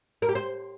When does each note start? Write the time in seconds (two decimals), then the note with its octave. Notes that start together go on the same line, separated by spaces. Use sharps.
0.22 A#4
0.29 G4
0.35 C5